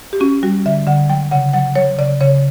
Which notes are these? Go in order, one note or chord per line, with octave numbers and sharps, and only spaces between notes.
G4
C#4 F#4
G3 F#4
D3 E5
D3 F#5
F#3 G5
C#3 F#5
F#3 F#5
F#3 C#5
C#3 D5
C#3 C#5